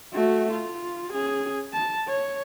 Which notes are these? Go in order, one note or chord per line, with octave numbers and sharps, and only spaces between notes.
A3 F#4
F4
C#4 G#4
A5
C#5